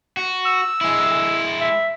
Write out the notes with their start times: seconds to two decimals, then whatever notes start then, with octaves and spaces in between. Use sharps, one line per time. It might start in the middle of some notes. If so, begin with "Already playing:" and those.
0.17 F#4
0.46 E6
0.81 G#3 E4
1.61 E5